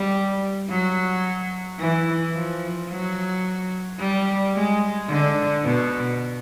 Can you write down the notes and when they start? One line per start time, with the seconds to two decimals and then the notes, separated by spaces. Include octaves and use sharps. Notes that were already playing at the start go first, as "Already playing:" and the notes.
Already playing: G3
0.69 F#3
1.79 E3
2.34 F3
2.90 F#3
3.99 G3
4.54 G#3
5.09 D3
5.65 B2